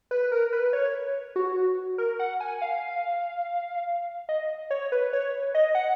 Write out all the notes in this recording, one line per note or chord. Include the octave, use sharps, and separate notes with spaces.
B4
A#4
B4
C#5
F#4
A#4
F#5
G#5
F5
D#5
C#5
B4
C#5
D#5
F#5